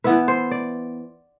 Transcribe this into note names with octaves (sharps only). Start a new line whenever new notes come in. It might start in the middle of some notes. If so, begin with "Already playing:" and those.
E3 B3 E4 B4
C5
D5